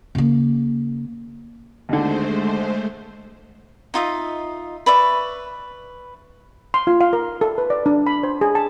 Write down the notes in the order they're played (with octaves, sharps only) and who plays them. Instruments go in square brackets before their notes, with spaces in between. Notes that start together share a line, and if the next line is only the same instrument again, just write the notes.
[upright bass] C#3 A#3
[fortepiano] D#2 D3 [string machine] G#3 A3 C5
[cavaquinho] D#4 F4 D#5 E5
B4 D5 E5 C#6
[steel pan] C6
F4
F5
A#4
A4
B4
D5
D4
B5
C5
G#4
A5